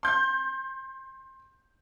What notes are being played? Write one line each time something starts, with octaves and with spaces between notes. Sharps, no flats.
C6 G6